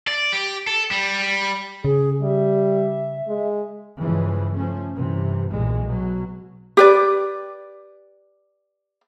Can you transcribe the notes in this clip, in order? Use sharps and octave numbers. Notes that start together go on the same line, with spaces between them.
D5
G4
A4
G3
C#3 G#4
G3 E5
G#3
G2 C#3 E3 F3 G#3
F3 A3 C#4
G2 C3 E3
B1 A#2 E3 G#3
B2 F#3
G4 B4 D5